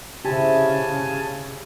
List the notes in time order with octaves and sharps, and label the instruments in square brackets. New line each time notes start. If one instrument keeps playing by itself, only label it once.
[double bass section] C#3 [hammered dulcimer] C4 D4 E4 [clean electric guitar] G4 [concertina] G#5 A5